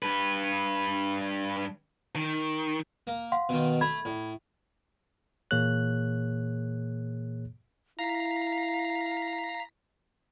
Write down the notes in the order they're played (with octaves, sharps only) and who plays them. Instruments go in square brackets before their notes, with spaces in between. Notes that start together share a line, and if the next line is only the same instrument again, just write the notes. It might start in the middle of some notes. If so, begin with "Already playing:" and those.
[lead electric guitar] G2 B4
D#3
[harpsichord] A#3
[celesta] F5 F#5 C6
[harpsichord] B2 D#3
[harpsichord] A3 [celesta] B5 G#6
[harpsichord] A2
[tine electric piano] A#2 E3 A#3 G#4 C#5 F#6
[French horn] E4 [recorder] F5 [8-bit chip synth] A#5 B6